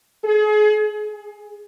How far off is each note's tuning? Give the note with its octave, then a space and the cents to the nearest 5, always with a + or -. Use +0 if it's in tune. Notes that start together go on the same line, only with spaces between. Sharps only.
G#4 +35
G#4 -10